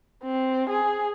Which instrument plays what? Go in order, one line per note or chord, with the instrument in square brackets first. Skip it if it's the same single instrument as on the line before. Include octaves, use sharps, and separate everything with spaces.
[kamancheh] C4
G#4